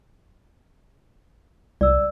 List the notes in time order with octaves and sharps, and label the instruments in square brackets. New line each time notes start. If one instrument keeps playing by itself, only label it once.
[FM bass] C2 [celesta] D5 E6